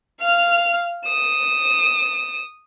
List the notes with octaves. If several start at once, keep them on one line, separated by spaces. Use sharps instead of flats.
F5 F6
D#6 E7